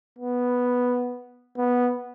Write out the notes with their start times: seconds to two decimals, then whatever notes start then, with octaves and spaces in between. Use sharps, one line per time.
0.19 B3
1.57 B3